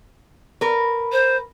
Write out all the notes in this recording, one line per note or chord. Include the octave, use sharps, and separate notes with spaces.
A#4 B4
C5